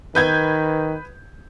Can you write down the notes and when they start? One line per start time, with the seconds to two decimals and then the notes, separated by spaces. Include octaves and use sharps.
0.15 D#3 B4 G6 G#6